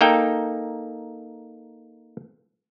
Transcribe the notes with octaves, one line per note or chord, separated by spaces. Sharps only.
A#3 D#4 A4 G5